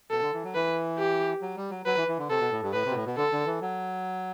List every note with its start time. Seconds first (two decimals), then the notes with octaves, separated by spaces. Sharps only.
0.11 B2 A4
0.21 D3
0.33 E3
0.44 F#3
0.55 E3 B4
0.99 G4
1.42 F#3
1.57 G3
1.70 F#3
1.86 F#3 B4
1.97 E3
2.08 E3
2.18 D3
2.30 C3 A4
2.40 B2
2.51 A2
2.62 G2
2.73 A2 B4
2.85 C3
2.91 B2
2.95 A2
3.06 B2
3.17 D3 A4
3.32 D3
3.46 E3
3.61 F#3